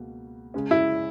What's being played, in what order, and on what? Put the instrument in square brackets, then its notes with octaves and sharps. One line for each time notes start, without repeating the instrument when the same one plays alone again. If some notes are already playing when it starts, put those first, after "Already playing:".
Already playing: [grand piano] C#2 B2 A#3
C#3 G#3 C#4
[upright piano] E4